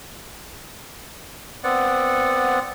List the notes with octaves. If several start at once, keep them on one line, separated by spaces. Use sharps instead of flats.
B3 C4 D5 F#5